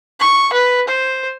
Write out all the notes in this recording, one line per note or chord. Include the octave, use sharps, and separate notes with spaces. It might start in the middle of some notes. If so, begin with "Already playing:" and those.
C#6
B4
C5